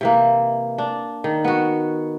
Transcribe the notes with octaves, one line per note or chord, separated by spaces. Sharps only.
C3 E3 A#3
D4
D#3
B3 F#4